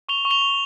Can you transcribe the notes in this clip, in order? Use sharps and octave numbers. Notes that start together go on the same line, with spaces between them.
C#6 F7 G7
C#6
F7 G7
C#6